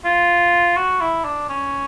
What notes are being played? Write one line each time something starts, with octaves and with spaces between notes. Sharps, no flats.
F4
F#4
E4
D4
C#4